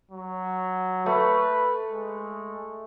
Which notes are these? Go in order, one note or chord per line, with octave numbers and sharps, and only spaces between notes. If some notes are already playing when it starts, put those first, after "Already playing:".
F#3
A3 B4
G#3